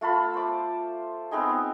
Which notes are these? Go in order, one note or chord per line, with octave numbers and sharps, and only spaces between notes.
A3 F4 A5 B5
C5 D6
B3 C4 D#4 G#4